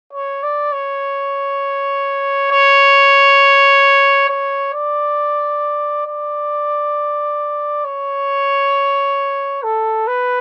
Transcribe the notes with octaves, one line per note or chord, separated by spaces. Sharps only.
C#5
D5
C#5
C#5
C#5
D5
D5
C#5
A4
B4